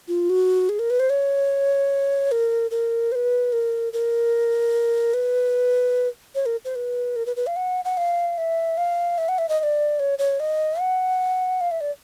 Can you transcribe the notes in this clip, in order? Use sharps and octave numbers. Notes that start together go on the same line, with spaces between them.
F4
F#4
G#4
A#4
B4
C5
C#5
A#4
A#4
C5
B4
A#4
A#4
B4
C#5
A#4
C5
B4
A#4
B4
B4
F5
F#5
F#5
F5
E5
F5
E5
F#5
E5
D#5
D#5
D5
C#5
C#5
D#5
F#5
F5
E5
D5